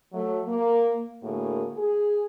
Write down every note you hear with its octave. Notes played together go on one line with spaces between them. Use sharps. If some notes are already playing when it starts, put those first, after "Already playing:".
F#3 A3
A#3
A2 D3 A#3 F#4 G#4 A#4
G#4